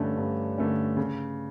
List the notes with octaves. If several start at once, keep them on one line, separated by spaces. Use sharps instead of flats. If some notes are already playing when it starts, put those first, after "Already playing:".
Already playing: G2 D3 A3 C#4
G2
D3 A3 C#4
C#3